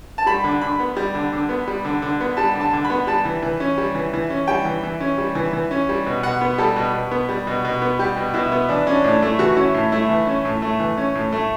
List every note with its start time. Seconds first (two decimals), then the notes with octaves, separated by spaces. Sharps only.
0.18 A5
0.26 G3 B5
0.44 D3
0.62 D3 B5
0.80 B3
0.97 G3
1.14 D3
1.33 D3
1.49 B3
1.68 G3
1.85 D3
2.02 D3
2.21 B3
2.37 G3 A5
2.54 D3
2.61 A5
2.73 D3
2.85 B5
2.90 B3
3.07 G3 A5
3.25 E3
3.43 E3
3.60 C#4
3.78 G3
3.95 E3
4.14 E3
4.30 C#4
4.48 G3 G5
4.65 E3
4.83 E3
5.00 C#4
5.18 G3
5.35 E3
5.53 E3
5.71 C#4
5.89 G3
6.06 B2
6.23 B2 F#5
6.41 B3
6.58 G3 A4
6.76 B2
6.93 B2
7.11 B3
7.29 G3
7.47 B2
7.65 B2
7.82 B3
7.99 G3 G4
8.17 B2
8.34 B2 E4
8.52 B3
8.69 E3 D4
8.87 C#4 D4
9.04 A2 D4
9.22 A3 E4
9.39 E3 F#4
9.56 C#4 E4
9.74 A2
9.92 A3 E4
10.09 E3
10.27 C#4
10.45 A2
10.62 A3
10.80 E3
10.97 C#4
11.15 A2
11.32 A3